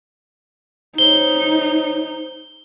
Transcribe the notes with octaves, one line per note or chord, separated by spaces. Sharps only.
D#4 C5 C#5 G7